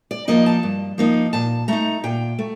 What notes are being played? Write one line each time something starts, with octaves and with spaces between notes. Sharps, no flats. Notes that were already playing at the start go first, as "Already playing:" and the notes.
D5
F3 A#3 D#4 D#5
A5
G2
F3 A#3 D#4
A#2 A5
A3 D#4 A#5
A#2 G5
A3